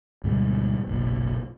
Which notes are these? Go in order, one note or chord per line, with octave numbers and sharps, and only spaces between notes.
D2 G#2 B2 G3
F#1 B1 A#2